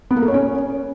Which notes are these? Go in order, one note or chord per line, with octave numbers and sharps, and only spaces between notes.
B3
A#3
A4
C#5
C#4